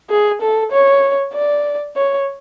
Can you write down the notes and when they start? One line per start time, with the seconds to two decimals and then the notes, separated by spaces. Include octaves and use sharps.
0.10 G#4
0.41 A4
0.72 C#5
1.34 D5
1.96 C#5